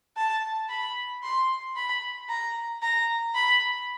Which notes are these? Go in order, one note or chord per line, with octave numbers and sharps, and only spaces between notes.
A5
B5
C6
B5
A#5
A#5
B5